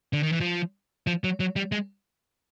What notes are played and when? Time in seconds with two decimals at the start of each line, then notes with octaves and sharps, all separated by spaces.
0.13 D3
0.23 D#3
0.33 E3
0.41 F3
1.07 F3
1.24 F#3
1.40 F#3
1.56 G3
1.72 G#3